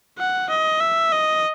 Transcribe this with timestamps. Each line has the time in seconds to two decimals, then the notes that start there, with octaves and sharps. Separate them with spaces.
0.19 F#5
0.50 D#5
0.80 E5
1.12 D#5